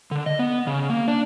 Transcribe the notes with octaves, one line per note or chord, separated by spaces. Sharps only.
D3
D#5
B3
C#3
A#3
D4